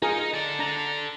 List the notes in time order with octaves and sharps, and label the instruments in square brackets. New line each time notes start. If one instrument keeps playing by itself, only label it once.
[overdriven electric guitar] D#4 [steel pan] F4 G#4 A#4
[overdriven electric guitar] A4 D5
[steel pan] D4 A#5